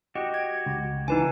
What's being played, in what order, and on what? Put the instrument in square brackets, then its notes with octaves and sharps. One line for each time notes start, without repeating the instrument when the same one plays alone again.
[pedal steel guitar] F#4 G4 [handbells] D#5
[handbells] G#6
[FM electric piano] C#2
[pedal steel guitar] D3 E3 [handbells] D#4 B4 G#5